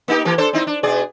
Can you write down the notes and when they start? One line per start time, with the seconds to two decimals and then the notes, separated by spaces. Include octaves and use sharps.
0.08 A#3 D#4 G4
0.25 E3 A#3 G4
0.38 D4 A4 C5
0.53 C4 D#4 E4
0.67 D4
0.83 B2 G#4 D5